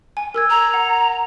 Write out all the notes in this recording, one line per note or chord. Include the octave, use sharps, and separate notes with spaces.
G#5
A#4 E6 G#6
A#5
F#5